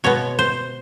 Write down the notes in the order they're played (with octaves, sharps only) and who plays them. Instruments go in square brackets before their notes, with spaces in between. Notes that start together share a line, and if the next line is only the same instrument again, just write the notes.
[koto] B2 G#3 B3 C#5
C5